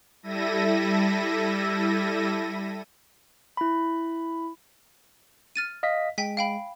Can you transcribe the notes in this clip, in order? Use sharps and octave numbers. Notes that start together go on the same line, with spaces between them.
G3 E4 A4 E5 A#6 D#7
E4 B5
F6 A6 D#7
D#5 F5 B6
G#3 G5 G#5 B6
F5 G5 B5